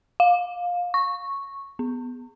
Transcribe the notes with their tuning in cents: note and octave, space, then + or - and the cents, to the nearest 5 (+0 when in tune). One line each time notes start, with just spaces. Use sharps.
F5 +20
C#6 -5
B3 +5